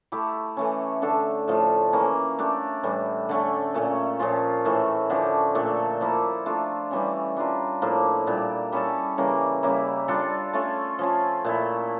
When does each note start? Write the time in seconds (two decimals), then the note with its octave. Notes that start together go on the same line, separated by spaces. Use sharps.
0.12 A3 E4 G4
0.57 E3 A3 C#4
1.02 D3 A3 D4 A4
1.48 A2 F3 A3
1.93 E3 A#3 C#4
2.38 A3 D4 G4
2.83 A2 E3 G3
3.29 D3 A3 C#4
3.74 A#2 A3 C#4
4.19 A#2 F3 C#4 F4
4.65 A2 E3 A3
5.10 D3 F3 C#4 G4
5.55 A#2 A3 D4 A4
6.01 F3 A#3 E4 A4
6.46 A3 D4 F4
6.91 E3 G3 C#4
7.36 G3 D4 F4 A#4
7.82 A2 F3 A#3 E4
8.27 A#2 G3 D4
8.72 G3 C#4 E4 A4
9.18 C#3 E3 G3 A#3
9.63 C#3 G3 A#3 E4
10.08 G3 D4 F4 A4
10.53 A3 C#4 F4
10.99 F3 C#4 F4
11.44 A#2 A3 E4